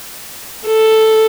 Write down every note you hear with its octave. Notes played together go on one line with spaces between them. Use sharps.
A4